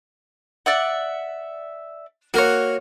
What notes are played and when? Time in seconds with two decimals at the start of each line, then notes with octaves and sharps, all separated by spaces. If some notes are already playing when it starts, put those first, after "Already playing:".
0.66 D5 E5 F#5
2.34 A#3 F#4 A#4 C#5